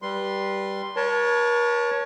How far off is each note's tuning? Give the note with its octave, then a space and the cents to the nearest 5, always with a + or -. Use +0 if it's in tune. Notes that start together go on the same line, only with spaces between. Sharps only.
G3 +0 B4 -20 C6 +0
A#4 +45 C#5 +5 A5 +0